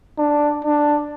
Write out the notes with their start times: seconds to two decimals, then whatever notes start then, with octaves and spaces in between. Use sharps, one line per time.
0.18 D4
0.64 D4